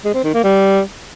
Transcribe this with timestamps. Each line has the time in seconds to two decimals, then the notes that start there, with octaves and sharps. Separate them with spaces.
0.05 G#3
0.14 C4
0.24 D#3
0.34 A#3
0.44 G3